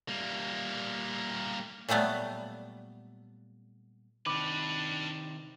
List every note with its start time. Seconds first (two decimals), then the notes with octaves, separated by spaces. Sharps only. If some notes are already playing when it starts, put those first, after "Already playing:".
0.08 G3 A#3
1.89 A#2 F#3 G3 A3 B3
4.26 C3 D#3 D4 B4 B5 D6